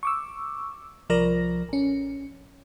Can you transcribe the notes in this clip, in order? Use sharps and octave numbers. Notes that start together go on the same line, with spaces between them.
C#6 D6 E6
C2 F3 A#4 D5 A#6
A1 C#4